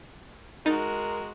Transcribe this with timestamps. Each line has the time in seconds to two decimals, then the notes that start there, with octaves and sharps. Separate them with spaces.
0.66 G#3 D#4 F#4 A#4 A6